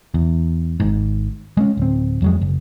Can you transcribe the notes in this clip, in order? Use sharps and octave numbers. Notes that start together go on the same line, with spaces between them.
E2
G#1 G#2
G#3 A#3 C#4
D1 C4
F2 F#3 G#3
F#1